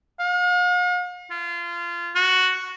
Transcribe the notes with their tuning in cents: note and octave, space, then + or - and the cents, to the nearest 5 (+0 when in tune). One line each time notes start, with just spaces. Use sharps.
F5 +45
F4 -25
F#4 +0